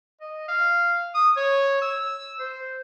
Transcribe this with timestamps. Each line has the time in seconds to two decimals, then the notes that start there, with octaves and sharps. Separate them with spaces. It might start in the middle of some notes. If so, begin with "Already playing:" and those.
0.21 D#5
0.48 F5
1.14 D#6
1.37 C#5
1.82 E6
2.40 C5